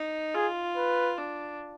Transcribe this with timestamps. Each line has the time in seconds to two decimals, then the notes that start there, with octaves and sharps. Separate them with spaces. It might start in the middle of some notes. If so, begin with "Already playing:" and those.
Already playing: D#4
0.35 F4 G#4
0.77 B4
1.18 D4